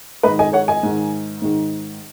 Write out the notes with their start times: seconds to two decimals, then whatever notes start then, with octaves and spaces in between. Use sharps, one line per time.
0.23 G#2 D#3 B4 D#5
0.39 D#5 G#5
0.53 C#5 F#5
0.68 D#5 G#5
0.83 G#2 D#3
1.42 G#2 D#3